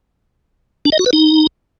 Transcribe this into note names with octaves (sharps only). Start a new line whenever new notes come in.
D4
D#5
F#4
B4
D#4